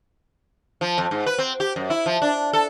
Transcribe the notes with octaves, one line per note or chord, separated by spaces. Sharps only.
F3
F2
G#2
B4
C4
G4
F#2
E4
F3
D4
A4